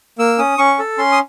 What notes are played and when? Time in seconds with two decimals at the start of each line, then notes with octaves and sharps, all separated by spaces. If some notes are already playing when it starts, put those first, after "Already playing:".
0.18 A#3 E6
0.38 C#4 D#6
0.58 C#4 C#6
0.79 A4
0.98 C#4 C6
1.12 D#6